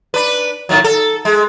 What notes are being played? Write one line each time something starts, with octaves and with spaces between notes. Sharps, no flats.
D4 B4
A2 D#3 F#3
A4
G#3